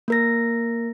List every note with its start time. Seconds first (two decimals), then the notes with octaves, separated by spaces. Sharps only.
0.08 A#3 A#4 A#6